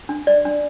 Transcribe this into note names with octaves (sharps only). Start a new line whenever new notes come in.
D4
D5
D4